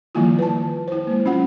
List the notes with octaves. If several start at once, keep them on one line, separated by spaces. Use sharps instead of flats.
D#3 F3 G3 A#3 E4 F4
B4 A5
E4 C5
G#3 A#3
F#3 C#4 F4 F#5